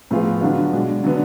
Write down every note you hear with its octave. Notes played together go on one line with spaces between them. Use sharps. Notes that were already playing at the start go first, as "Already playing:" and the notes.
A2 F3 B3 F4 G#4
D3 F#3 B3 D4 F4
B2 G#3 D4
D3 F#3 B3 D4